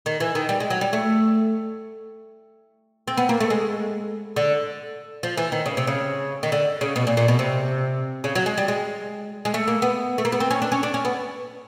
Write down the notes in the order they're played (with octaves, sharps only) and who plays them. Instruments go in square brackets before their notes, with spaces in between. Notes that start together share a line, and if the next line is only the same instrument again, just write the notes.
[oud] D#3
E3
D#3
G3
G#3
F#3
G3
A3
C4
B3
A#3
A3
G#3
D3
F3
E3
D#3
C#3
C3
C#3
D#3
D3
C#3
B2
A#2
A#2
B2
C3
C#3
F#3
G#3
G3
G#3
G#3
A3
A#3
B3
A3
A#3
B3
C4
C#4
D4
C#4
D4
C#4
B3